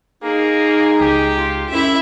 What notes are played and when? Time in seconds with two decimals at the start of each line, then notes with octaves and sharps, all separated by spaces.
0.23 A#3 D#4 G#4
1.00 C#2 G4
1.37 F4
1.69 F#2 E4 E5